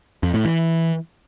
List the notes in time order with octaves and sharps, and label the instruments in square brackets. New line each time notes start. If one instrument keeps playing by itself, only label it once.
[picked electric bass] F2
A2
E3